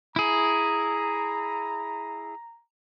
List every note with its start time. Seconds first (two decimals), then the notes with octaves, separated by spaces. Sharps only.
0.16 E4 G#4 A#5